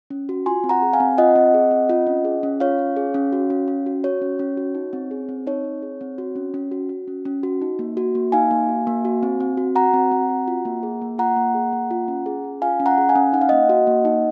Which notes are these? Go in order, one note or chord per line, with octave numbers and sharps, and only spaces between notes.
C#4
F#4
F4 G#5 C6
C4
F#5 A#5
G#4
F5 G#5
C4
F4 D#5 F#5
C4
G#4
C4
F4
C#4
G#4
C#4
F4 C#5 F5
C#4
G#4
C#4
F#4
C#4
C#4
F#4
F#4 C#5
C#4
C#4
F#4
D#4
C4
G#4
C4
D#4 C#5
C4
G#4
C4
F#4
C#4
C#4
F#4
F#4
C#4
C#4
F#4
D#4
A#3
F#4
A#3
D#4 F5 G#5
A#3
F#4
A#3
F#4
C4
C4
F#4
F#4 F#5 A#5
C4
C4
F#4
F4
A#3
G#4
A#3
F4 F#5 A#5
A#3
G#4
A#3
F4
C#4
G#4
C#4
F4 F5 G#5
C#4
F#5 A#5
G#4
F5 G#5
C#4
D#4 F#5
F5
A#3 D#5 F#5
F#4
A#3
D#4